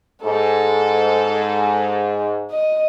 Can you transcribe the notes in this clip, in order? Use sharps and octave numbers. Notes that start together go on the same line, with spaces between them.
G#2 A4
D#5